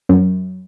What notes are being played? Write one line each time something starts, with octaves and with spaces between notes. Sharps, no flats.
F#2